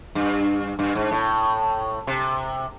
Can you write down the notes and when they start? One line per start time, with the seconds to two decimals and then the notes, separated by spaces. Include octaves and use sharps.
0.15 G2
0.79 G2
0.95 G#2
1.11 A2
2.07 C3